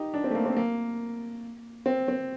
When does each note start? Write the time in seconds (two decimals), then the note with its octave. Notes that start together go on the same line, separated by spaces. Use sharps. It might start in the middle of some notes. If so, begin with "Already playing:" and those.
Already playing: D#4 G4
0.14 D4
0.24 C4
0.30 A3
0.35 A#3
0.46 C4
0.56 A#3
1.86 C4
2.08 C4